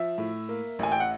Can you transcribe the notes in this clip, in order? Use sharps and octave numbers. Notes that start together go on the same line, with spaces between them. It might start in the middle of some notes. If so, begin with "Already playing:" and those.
Already playing: F3 E5
A2
A#3
A1 G#5
G5
F#5